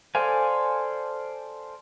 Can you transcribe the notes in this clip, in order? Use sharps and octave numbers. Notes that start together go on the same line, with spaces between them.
A4 C5 D5 F5 G#5